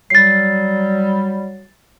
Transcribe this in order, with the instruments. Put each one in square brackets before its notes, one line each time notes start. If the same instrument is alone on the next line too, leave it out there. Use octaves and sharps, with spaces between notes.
[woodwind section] F#3 G3 [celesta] A6 C7